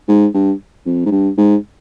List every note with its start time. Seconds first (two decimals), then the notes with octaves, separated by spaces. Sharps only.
0.09 G#2
0.34 G2
0.86 F2
1.06 G#2
1.11 G2
1.38 G#2